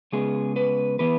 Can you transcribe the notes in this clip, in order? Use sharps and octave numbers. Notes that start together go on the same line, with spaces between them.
C#3 G#3 B3 G#4
B4
E3 B3 B4